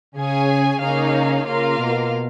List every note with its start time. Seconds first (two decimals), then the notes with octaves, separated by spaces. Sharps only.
0.15 C#3 C#4 G#4 C#5 G#5
0.80 C#3 A#3 D#4 G#4 C#5 F5
1.45 C#3 A#3 F4 A#4 F5
1.78 B2